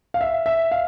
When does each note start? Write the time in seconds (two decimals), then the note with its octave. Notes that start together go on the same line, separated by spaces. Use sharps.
0.14 F5
0.21 E5
0.46 E5
0.71 F5